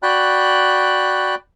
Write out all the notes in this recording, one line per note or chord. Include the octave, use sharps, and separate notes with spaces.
F#4 D5 G5 B5 F#6